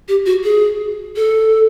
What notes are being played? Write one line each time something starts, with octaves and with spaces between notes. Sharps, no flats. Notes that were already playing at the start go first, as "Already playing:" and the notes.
G4
F#4
G#4
A4